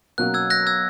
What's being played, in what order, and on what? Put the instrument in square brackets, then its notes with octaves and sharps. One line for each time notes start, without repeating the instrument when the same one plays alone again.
[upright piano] B2 F#3 A#3 C#4 [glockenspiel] F#6
[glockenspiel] E6 G#6
F#6 A#6
E6 G#6